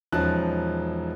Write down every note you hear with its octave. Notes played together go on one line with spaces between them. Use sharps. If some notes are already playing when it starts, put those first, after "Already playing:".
E1 F3 C#4 D#4 A5 F#6